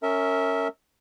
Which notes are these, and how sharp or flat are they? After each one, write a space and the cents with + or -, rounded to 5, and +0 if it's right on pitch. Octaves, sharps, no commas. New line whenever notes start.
C#4 +0 A#4 -25 E5 -20